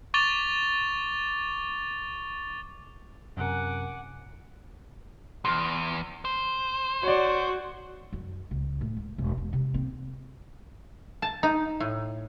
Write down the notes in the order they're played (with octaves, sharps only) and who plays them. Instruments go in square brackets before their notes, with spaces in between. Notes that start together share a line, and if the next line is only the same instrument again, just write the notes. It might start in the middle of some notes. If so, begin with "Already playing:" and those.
[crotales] C#6 D6 A6 F7 G7
[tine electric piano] F#2 C3 A#4 [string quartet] F#5 G#5 D6
[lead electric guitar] E2 [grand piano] C6 F6
[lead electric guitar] C5
[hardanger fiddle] F#4 [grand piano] C#5 D5
[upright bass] F#2
C#2
A2
C#2
E1
E1
C3
C4
[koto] A5
D#4
A2